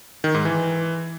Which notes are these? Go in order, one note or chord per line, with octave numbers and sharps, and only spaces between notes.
D#3
G#2
E3